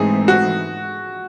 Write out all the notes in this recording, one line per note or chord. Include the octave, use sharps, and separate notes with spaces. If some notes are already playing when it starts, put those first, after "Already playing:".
Already playing: G#2 E3 A3 C4 D#4 G#4
F#4